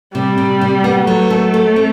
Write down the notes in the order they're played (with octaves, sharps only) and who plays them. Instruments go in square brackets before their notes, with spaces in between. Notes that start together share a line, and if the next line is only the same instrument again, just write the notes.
[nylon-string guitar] C3 [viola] G3
[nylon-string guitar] C3
C3
B3
[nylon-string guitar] F#3 [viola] A3
[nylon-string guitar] A4
A4
C4